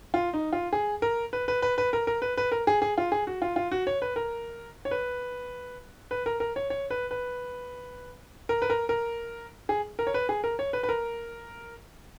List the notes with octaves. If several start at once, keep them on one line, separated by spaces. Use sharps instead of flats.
F4
D#4
F4
G#4
A#4
B4
B4
B4
B4
A#4
A#4
B4
B4
A#4
G#4
G#4
F4
G#4
F#4
F4
F4
F#4
C#5
B4
A#4
C#5
B4
B4
A#4
A#4
C#5
C#5
B4
B4
A#4
B4
A#4
A#4
G#4
A#4
C#5
B4
G#4
A#4
C#5
B4
B4
A#4